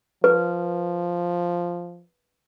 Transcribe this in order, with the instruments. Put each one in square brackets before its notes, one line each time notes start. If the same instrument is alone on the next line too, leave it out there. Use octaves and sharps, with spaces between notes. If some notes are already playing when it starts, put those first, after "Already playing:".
[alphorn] F3 [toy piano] B4